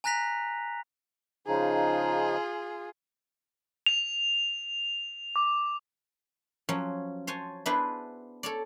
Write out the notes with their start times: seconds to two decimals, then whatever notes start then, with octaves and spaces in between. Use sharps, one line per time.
0.04 G#5 A#5 F#6 A#6 B6 F7
1.47 C#3 F3 D#4 F4 G#4
3.86 F7
5.36 D6
6.69 F3 F#3 C#4
7.27 C5 C#5 G#5 A5
7.66 B3 D4 E4 G#4 B4 C5
8.43 A4 C#5 D5